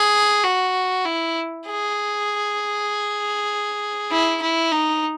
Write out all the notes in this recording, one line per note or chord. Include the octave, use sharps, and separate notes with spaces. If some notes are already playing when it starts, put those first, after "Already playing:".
Already playing: G#4
F#4
E4
G#4
E4
E4
D#4